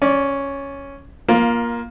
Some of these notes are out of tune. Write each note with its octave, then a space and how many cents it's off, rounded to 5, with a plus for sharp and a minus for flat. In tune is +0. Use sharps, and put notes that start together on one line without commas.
C#4 +0 D5 -20
A#3 +15 F4 +0